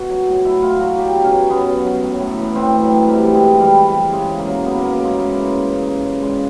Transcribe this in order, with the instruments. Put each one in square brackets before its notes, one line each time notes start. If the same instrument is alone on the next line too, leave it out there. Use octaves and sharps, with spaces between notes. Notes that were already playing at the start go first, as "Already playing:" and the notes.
Already playing: [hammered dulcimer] B2 F#4
F#3
A2
F#3 E4
A2 F4
F#3 F#4
F#3 G4
B2
C#4
F#3
F#3 B3
F#3
F#3
A2
A2
E3
A2 C4
E3
F#3
A2
C3 G3
E3
G#3
C3
E3 G3
E3
G3
E3
C#3 G#3
C#3
A#3
F#3
C#3 B3
C#3 A#3
A#3
C#3 G#3
E3
C#3
C#3
C#3
C#3
C#3
A#2 G#3